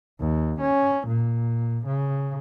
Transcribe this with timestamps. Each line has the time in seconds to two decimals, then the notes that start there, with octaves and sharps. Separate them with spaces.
0.20 D#2
0.61 C#4
1.07 A#2
1.86 C#3